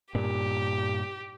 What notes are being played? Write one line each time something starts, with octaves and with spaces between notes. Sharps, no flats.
G2 A#2 G4